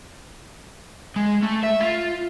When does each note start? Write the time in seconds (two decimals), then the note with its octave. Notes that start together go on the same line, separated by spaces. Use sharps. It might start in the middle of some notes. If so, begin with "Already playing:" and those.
1.16 G#3
1.42 A3
1.63 E5
1.81 F4